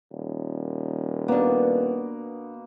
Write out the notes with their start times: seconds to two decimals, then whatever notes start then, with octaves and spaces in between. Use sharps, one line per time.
0.12 D#1
1.28 B2 A#3 B3 D4